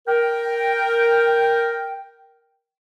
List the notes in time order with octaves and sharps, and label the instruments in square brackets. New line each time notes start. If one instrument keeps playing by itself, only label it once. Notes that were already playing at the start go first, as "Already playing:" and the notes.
[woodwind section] A#4 G5